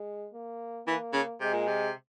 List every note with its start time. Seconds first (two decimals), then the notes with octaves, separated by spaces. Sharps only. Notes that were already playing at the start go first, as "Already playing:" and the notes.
Already playing: G#3
0.33 A#3
0.86 E3 A#3
1.13 C#3
1.40 C3 G#3
1.54 A#2
1.67 C3